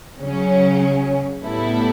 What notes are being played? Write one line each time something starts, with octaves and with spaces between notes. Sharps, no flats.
C#3 F#3 C#4
A2 G3 B3 E4 A4